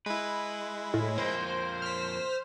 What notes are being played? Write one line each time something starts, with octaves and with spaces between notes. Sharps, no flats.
G#3 E4 B4
A2
F2 A#3 C5
F6 B6